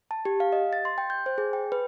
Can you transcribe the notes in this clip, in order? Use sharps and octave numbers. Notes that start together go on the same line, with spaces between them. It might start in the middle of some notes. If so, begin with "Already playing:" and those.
A5
G4
F5
D#5
A6
C6
G5
G6
C5
G#4
G5
B4